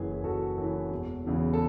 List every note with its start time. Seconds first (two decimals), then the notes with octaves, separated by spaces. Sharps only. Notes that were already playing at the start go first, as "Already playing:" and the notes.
Already playing: F#1 F#2 E3 G#4 B4
0.11 G#4
0.24 F#1 F#4 A4
0.58 F#2 E3
0.91 E1
1.25 E2 C#3 E3
1.53 A4